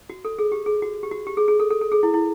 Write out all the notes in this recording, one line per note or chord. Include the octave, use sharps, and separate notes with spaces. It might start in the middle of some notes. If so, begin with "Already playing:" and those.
F#4
A4
G#4
G4
G#4
F#4
G4
F#4
G4
G#4
G#4
A4
A4
A4
G#4
E4
E4